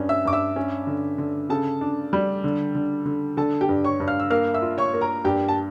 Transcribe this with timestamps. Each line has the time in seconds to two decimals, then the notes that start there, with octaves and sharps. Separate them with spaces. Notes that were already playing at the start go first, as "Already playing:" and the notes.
Already playing: G2 C#4
0.09 E5 E6
0.25 G2 D6
0.33 E5 E6
0.56 C#4
0.87 D3
1.18 D3
1.49 C#3 A4 A5
1.81 D4
2.13 G3
2.44 D3
2.75 D3
3.06 D3
3.37 D3 A4 A5
3.61 G4 G5
3.69 G2
3.84 C#5 C#6
4.00 G2
4.07 F5 F6
4.20 E6
4.30 A#3 F5 F6
4.54 E5 E6
4.62 F4
4.78 C#5 C#6
4.93 A#3
5.01 A#4 A#5
5.25 G2 G4 G5
5.48 A5